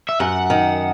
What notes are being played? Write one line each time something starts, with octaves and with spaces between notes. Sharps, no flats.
E5
F#2 F#5
D#3